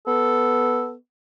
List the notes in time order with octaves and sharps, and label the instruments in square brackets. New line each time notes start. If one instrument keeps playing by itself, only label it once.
[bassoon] B3 [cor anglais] A4